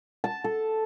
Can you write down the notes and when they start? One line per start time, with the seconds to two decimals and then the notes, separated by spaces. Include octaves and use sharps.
0.24 A5
0.44 A4